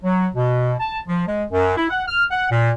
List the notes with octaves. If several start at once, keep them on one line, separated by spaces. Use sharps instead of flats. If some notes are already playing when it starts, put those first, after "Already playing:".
F#3
B2
A5
F3
G#3
F#2
E4
F#5
F6
F#5
A#2